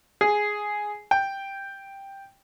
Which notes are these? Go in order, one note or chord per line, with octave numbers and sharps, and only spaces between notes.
G#4
G5